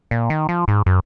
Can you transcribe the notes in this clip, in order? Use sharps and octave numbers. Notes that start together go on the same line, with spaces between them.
A#2
D#3
F3
G#2
F#2